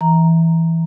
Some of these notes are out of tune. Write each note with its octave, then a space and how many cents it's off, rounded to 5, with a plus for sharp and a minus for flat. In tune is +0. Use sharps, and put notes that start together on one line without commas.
E3 +0 A#5 +0